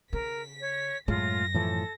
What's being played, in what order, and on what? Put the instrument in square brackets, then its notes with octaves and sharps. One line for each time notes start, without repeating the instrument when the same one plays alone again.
[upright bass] C#3 [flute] A#4 [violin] B6
[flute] C#5
[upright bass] F#2 [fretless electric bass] A2 G#3 [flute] F4 [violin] A#6
[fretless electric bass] A2 E3 F3 [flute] A4